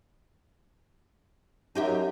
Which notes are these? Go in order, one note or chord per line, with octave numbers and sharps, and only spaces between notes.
F#2 D#4 G4 E5